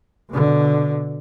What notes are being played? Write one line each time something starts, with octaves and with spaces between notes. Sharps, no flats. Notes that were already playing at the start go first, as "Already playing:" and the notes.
B2 D3